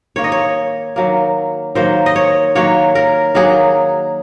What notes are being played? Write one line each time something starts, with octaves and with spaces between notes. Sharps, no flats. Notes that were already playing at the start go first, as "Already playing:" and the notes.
D#3 A#3 C#5
D#5
C#5
D#3 F#3 A#3
D#3 F#3 A#3 C5
D#5
C#5
D#3 F#3 A#3 C#5
A#4
D#3 F#3 A#3 G#4